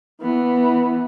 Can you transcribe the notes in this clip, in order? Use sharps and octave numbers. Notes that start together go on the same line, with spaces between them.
E3 B3